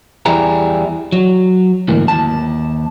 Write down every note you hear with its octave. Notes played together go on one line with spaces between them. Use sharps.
E2 G3 E4 G#4 A#5
F#3
D2 G#2 E3 A#3
D#2 A5